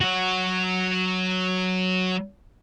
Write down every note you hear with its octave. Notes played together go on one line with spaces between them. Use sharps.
F#3 F#4